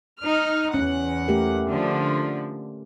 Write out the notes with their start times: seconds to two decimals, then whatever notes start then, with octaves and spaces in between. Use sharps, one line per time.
0.21 D#4 F6
0.74 E2 C#4 F#5
1.28 A3 G4 A#4
1.68 D3 F3